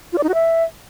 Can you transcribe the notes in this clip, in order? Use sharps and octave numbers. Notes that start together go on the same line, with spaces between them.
F4
D5
D#4
F#4
E5